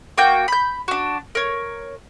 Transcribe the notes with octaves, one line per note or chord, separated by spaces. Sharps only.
A#3 F#4 G5 G6
B5 G6
D4 F#4
A#4 C#5